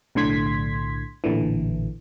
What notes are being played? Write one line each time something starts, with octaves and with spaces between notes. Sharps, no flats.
B1 A2 D3 C6 G#6 B6
A1 A#2 D3 E3